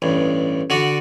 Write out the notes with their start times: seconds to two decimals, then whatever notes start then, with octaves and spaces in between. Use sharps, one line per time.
0.02 A1 G2
0.70 D3 F#4 D5